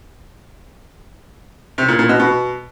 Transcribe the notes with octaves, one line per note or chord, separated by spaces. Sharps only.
C3
A#2
A#2
B2
B2